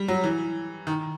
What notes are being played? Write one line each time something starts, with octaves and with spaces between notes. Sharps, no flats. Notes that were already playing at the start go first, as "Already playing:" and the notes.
Already playing: G3
F#3
E3
D#3